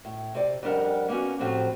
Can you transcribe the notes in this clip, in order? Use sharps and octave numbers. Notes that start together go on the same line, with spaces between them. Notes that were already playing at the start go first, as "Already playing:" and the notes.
A2
C3 D5
F2 G3 D4 A#4 F#5
A#3 B3 C#4 F#4
A2 F3 F#3 C4 G4